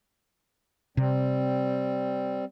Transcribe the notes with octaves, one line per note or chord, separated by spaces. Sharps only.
C3 G3 C4